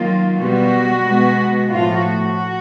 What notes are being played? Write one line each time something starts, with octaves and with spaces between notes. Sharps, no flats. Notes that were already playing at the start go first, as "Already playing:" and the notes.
Already playing: D#3 F#3 A#3 F4
B2 G3 B3 F#4
B2 G#3 B3
A2 F3 A3 F4
F#4